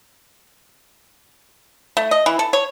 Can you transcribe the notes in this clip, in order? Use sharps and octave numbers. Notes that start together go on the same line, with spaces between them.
A3
D#5
E3
A4
C#5